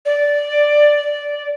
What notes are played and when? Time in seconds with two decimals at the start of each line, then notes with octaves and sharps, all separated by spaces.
0.06 D5